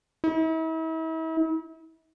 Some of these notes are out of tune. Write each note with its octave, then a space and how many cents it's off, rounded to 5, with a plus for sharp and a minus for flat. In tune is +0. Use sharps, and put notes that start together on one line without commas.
E4 -40